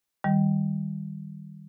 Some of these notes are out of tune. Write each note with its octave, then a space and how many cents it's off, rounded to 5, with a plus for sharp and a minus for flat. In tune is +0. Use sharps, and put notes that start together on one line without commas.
D#3 +0 G3 +0